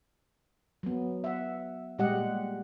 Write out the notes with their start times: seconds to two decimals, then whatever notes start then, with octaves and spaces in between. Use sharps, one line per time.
0.83 F#3 B3
1.24 E5 F#5
1.98 A#2 G3 G#3 G4 D#5 F#5